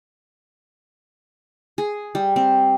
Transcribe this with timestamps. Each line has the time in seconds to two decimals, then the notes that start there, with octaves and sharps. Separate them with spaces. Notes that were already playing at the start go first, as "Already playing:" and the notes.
1.78 G#4
2.15 G3
2.36 C4